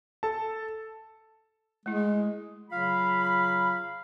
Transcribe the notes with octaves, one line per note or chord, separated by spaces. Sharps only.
A4 A5
G#3 A3 E4
C#3 F#3 F4 F5 B5